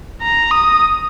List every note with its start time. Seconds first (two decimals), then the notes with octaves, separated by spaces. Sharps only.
0.22 A#5
0.52 D#6